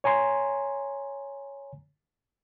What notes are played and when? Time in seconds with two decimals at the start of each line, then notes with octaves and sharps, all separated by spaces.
0.04 C#5 G#5 A#5 C6